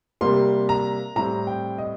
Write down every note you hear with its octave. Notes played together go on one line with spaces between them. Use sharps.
C3 G3 A#3 C6
A#5
A2 G3 C4 A#5
G5
D#5